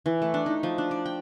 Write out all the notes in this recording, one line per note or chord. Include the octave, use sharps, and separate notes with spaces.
E3
A3
D4
D#4
F3
D4
D5
G5